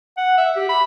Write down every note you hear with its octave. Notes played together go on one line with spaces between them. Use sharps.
F#5
E5
G4
B5